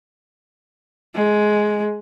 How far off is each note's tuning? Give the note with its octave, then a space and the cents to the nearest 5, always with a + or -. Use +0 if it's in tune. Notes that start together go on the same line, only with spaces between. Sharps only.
G#3 +10